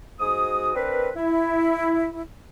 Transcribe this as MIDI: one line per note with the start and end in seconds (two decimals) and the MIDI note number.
0.20 0.72 44
0.20 0.72 66
0.20 0.72 87
0.75 1.10 60
0.75 1.10 62
0.75 1.10 70
0.75 1.10 71
1.16 2.22 64